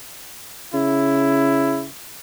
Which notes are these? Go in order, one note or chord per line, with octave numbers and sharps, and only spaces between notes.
C#3 E4